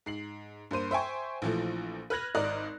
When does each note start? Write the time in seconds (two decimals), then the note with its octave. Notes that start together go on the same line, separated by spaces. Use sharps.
0.06 G#2 C7 F#7
0.71 G2 A#3 C5 D#7
0.91 C5 E5 G5 G#5 C#6
1.42 A#1 E3 F3 A3
2.10 B4 F6 F#6 G#6 A#6 F#7
2.35 G#1 A#4 D5 D#5 A#5 F#6